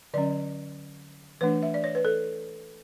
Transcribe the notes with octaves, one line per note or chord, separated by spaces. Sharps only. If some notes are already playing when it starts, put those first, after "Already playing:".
D3 F#3 C#4 D5
E3 A3 D4 B4
E5
D5
C#5
B4
A4